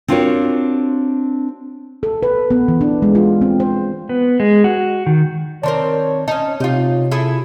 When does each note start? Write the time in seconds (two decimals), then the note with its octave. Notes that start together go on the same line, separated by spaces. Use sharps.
0.08 C4 D4 F4 F#4 A#4 C#5
2.03 A4
2.23 B4
2.51 B3
2.68 E3
2.81 D4
3.02 G#3
3.15 F4
3.41 C4
3.60 C5
4.09 B3
4.40 G#3
4.64 F#4
5.07 D#3
5.63 D#3 C4 A#4 C#5 D5 A5
6.28 C#4 D#4 A5
6.60 C3 D#4 F4 C#5
7.11 E4 G#4 A4